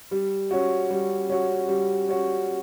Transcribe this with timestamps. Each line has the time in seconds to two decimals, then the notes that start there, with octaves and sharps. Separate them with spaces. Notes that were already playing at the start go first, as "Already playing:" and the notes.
0.11 G3
0.51 C#4 F#4
0.90 G3
1.30 C#4 F#4
1.68 G3
2.09 C#4 F#4